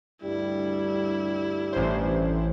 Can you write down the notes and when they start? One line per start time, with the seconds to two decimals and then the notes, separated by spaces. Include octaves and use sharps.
0.22 D2 G2 G3 E4
1.73 A1 C5